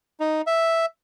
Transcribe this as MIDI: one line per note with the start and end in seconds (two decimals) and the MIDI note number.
0.20 0.42 63
0.47 0.86 76